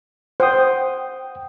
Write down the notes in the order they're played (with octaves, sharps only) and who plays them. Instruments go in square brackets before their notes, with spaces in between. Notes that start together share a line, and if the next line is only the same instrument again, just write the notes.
[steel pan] C5 [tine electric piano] F#5 G5 D#6